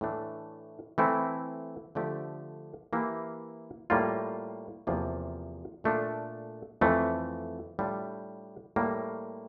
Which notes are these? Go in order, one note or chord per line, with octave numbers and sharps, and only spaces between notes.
A2 E3 A3 D4
E3 A3 C4 E4
D3 F3 A3 D4 G4
E3 A#3 E4 G4
A2 G3 A#3 F4
E2 C3 F3 A#3 F4
A#2 A3 D4 F4
F2 E3 A3
A2 G3 D4 F4
A2 G3 A#3